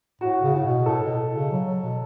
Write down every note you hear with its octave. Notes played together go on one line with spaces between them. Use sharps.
A2 F#4
C#3
A2 F#4
B2
A2 A4
B2
C#3
F#3
F#3
B2